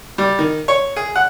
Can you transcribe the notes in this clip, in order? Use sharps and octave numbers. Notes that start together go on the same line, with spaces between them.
G3
D#3
C#5
G#4
F#5